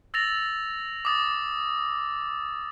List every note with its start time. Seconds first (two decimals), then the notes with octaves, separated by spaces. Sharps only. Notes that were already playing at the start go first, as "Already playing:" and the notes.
0.14 E6 A6 A#6 F7
1.05 D6 D#6 A6